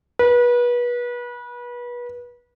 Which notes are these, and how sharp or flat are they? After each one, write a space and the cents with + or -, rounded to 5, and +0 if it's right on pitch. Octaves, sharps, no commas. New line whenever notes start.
B4 -30